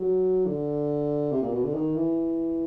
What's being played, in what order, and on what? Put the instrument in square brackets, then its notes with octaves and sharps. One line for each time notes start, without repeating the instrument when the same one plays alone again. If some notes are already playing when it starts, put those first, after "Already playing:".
Already playing: [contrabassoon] F#3
D3
C3
A#2
B2
D3
D#3
E3